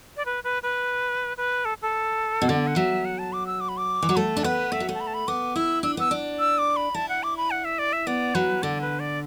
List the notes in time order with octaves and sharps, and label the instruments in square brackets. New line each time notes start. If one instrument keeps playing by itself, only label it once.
[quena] D5
B4
B4
B4
B4
A4
A4
[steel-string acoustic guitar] B2
[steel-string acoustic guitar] D3 [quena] D5
[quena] F#5
[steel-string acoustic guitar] F#3 [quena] E5
[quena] F#5
A5
D6
E6
D6
B5
D6
[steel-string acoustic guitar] E3
F#3
[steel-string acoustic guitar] A3 [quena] A5
[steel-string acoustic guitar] D4
[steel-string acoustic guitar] B3 [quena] B4
[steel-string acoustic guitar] A3 [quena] E5
[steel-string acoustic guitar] F#3
A3
[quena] A5
B5
A5
B5
[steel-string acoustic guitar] B3 [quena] D6
[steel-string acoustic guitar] E4 [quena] E6
[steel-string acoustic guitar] D4 [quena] E6
[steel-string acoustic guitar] B3 [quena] E6
[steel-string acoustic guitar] D4
[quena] E6
D6
B5
[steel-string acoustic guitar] E4 [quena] A5
[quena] F#5
D6
B5
F#5
E5
D5
E5
[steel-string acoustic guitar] B3 [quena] D5
[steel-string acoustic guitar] F#3 [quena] B4
[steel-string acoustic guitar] D3 [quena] D5
[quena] B4
D5